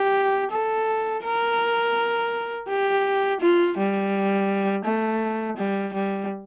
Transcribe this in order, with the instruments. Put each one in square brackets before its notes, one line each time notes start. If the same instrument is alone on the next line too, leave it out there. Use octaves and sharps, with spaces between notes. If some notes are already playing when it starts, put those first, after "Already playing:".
Already playing: [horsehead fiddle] G4
A4
A#4
G4
F4
G3
A3
G3
G3